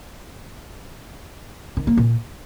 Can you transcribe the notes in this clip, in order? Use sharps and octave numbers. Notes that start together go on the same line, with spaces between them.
D#3
A#3
A#2